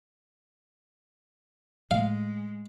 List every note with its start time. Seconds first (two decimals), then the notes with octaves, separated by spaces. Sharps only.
1.91 A2 G#3 A3 F5